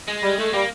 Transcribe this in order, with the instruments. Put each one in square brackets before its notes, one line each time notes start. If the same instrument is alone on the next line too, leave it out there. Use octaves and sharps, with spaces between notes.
[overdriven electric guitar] G#3
[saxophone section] G3
A3
[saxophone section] G3 [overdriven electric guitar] A#3